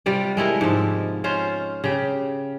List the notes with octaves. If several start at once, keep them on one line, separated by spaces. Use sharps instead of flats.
C3 G3 F4 D5
G#3 A3 E4 A#4
G#2 F3
C#4 F4 C5
C#3 G4